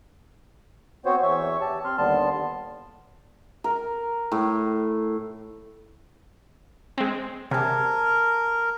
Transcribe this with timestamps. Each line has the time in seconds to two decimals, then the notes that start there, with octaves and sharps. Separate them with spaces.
1.05 B3 C4 F#4 C5 C#5
1.22 E2 E3 C#5 E5 C#6
1.61 G4 A5
1.85 C4 C6 F6
1.98 D#2 D3 G3 B3 A5 C6
3.64 A#4
4.32 A2
6.98 G#3 C4
7.51 C3 A#4 G#5 A5